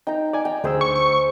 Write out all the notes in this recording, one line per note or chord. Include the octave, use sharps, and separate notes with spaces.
D#4 G5 A#5
D5 G#5 D6
G5 A#5
D2 G#4 B4 C5 G5 E6
C#6
C#6